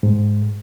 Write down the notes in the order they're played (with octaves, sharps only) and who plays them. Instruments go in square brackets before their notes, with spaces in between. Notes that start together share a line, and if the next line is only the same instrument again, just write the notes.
[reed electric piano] G#2